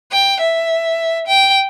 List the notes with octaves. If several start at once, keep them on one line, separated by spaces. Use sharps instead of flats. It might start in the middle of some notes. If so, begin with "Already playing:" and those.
G5
E5
G5